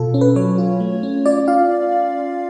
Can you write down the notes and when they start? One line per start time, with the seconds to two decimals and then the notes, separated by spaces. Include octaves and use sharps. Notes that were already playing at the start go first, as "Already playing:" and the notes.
Already playing: B2 F4 A4
0.14 C#4
0.21 B4
0.36 F#3 C#5
0.58 F4
0.80 A3
1.03 C#4
1.25 F4 D5
1.48 F4 F5